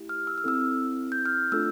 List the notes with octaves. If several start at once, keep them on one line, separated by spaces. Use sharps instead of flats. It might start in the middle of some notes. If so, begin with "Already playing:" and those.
Already playing: A3 E4 G4
F6
E6
F6
C4 E4 A4 E6
G6
F6
A3 D4 F4 A4 E6